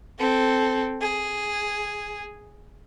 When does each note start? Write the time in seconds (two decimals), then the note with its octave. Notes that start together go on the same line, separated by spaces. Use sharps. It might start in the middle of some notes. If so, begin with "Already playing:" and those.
0.19 C4 A4
0.99 G#4